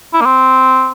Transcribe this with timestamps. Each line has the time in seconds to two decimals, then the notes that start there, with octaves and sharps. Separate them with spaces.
0.13 E4
0.21 A#3
0.25 C4